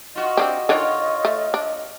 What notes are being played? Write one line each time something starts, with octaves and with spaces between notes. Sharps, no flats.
F4 F#4 D#5
C4 D4 G4
D3 D#3 D4 F4 C#5
A3
D4